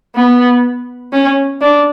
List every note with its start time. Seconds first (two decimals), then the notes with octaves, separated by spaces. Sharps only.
0.15 B3
1.13 C#4
1.61 D4